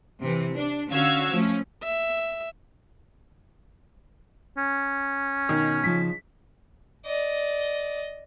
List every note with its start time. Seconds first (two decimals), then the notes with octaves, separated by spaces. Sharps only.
0.21 C3 E3
0.56 D4
0.89 D3 C#4 F#4 F5 E6 G#6
1.32 F3 A3 C#4
1.83 E5
4.57 C#4
5.49 B2 D#3
5.84 C#3 F3 D#4 B6
7.06 D5 D#5